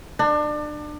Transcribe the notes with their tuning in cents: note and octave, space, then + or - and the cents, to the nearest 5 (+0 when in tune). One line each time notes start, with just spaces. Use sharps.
D4 +30